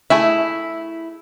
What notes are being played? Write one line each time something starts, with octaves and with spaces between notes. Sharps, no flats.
A3 E4 G#4 E5